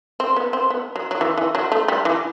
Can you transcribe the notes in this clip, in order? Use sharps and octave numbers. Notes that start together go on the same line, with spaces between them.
C4
B3
C4
B3
F#3
F#3
E3
E3
F#3
A3
G3
E3